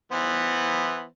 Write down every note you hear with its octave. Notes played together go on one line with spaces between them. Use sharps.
E3 B3 C5